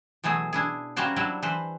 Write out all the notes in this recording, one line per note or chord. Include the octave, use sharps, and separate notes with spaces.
B2 E3 F#3 A3 G#4
D4 E4 G#4
G3 A#3 C#4 F#4 C5 D5
F#3 G3 D4 E4
E3 B4 C5